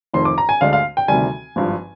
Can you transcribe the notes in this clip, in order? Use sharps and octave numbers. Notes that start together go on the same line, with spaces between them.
F1 F2 D#3 C6
D6
A#5
G#5
D2 D3 G#3 D4 F5
F5
G5
D2 C3 D#3 G3 G#5
G#1 G2 F3